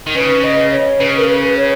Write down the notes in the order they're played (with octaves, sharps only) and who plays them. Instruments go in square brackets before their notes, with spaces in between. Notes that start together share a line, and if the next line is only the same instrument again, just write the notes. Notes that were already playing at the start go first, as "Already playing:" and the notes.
[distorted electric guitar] D#3
[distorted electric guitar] C#3 [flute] B4
[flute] D#5
C#5
[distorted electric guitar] C#3 [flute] B4
[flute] A#4
B4
C#5